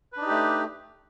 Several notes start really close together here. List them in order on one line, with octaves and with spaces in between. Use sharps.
B4 D4 D#4 G4 A3